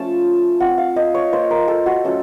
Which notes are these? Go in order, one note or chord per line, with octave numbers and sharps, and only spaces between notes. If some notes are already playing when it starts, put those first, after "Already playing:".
Already playing: F3 A3 C#4 A5
A3 C4 F4 F#5
F5
D#5
C#5
A#3 F4 C5
A#4
A4
F#4
F#3 A3 C#4 F4 A4